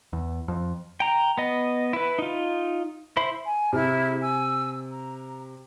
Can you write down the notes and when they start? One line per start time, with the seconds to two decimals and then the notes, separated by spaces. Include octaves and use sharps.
0.13 E2
0.48 F2
1.00 G5 A#5
1.38 B3 D#5
1.93 E4 B4
2.19 D#4 F4
3.17 E4 C5 E5 B5
3.46 G#5
3.73 C3 E4 G#4 F6
4.19 G#5 E6
4.90 A#5